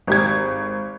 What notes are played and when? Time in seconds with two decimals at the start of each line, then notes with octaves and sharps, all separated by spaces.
0.07 G#1 G4 G#6